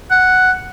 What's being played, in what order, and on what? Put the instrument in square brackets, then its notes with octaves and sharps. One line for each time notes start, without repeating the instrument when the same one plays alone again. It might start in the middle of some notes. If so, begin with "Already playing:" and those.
[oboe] F#5